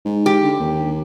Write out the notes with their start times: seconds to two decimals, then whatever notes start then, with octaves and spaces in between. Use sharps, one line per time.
0.05 G#2
0.26 G4
0.43 D3
0.60 D#2